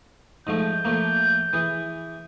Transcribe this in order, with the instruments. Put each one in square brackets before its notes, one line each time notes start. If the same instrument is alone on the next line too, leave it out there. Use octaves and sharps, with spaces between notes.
[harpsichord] G#2 F3 A3 [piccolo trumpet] G6
[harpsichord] F3 A3 A#3
E3 G#4